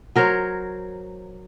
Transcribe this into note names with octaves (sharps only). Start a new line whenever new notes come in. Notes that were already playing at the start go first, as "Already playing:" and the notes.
F#3 A#4 C5 C#5